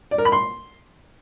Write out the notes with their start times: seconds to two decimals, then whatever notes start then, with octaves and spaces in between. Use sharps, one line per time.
0.11 D5
0.18 A#4
0.25 B5
0.32 C6